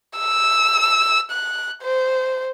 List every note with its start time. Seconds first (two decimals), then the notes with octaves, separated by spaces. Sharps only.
0.18 E6
1.31 F#6
1.82 C5